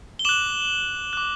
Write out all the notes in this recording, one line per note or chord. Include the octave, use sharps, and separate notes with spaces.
G7
D6 F#6 E7 F#7
D6 F#6